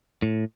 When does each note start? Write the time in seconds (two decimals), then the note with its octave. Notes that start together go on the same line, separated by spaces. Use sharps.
0.22 A2